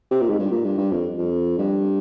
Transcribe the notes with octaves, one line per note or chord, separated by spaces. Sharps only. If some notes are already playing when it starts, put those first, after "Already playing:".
C3
A#2
G#2
G2
A#2
G2
G2
F2
F2
G2